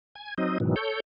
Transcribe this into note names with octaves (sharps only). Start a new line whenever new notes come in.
G#5 G#6
F#3 C4 D#4 D#5
G#2 B2 D#3 E3 F#3
A4 C#5 G6